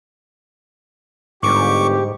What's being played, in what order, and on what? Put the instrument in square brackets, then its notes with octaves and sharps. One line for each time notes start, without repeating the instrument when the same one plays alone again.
[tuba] G1 [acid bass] G#2 [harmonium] G4 [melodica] C#6 D6